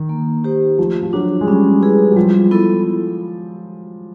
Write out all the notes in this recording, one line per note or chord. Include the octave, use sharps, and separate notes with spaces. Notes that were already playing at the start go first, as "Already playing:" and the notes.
Already playing: D#3
A#3
D#4 G4 C5
F3 A3
F3
F#3 D4 F#4
G#3
G3 C#4
E4 G#4 B4
F#3
F3 G3
B3 E4 A4